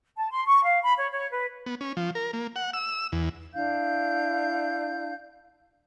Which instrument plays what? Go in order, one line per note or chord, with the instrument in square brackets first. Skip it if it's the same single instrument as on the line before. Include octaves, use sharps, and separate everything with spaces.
[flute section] A5
C6
C#6
F5
B5
C#5
C#5
B4
[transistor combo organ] B3
C#4
F3
A#4
A#3
F#5
E6
E2
[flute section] D4 E4 F5 G6